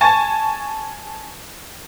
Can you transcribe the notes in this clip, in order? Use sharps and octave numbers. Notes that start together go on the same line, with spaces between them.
G#5 A5 C#6 A6